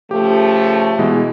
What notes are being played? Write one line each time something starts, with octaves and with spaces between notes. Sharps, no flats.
C#3 F3 A3 G4
B2 E3 G#3